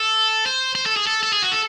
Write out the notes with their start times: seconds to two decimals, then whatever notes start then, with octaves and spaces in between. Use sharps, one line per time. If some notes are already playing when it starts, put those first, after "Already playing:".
Already playing: A4
0.46 C5
0.75 C5
0.86 A4
0.97 G#4
1.07 A4
1.23 A4
1.33 G#4
1.42 F#4
1.52 A4